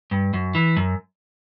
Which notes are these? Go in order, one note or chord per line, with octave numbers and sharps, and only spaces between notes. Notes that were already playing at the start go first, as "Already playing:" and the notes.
G2
F#2
E3
F#2